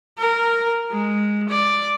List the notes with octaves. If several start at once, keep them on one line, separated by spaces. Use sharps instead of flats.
A#4
G#3
D5